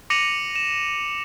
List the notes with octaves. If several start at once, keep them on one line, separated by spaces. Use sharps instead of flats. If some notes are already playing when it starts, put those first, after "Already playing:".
D6 A#6 C#7 D#7 F7 F#7
E7